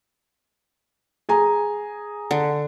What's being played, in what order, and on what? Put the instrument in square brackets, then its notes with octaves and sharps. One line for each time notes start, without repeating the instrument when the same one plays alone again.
[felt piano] G#4 G#5 A#5
[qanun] D3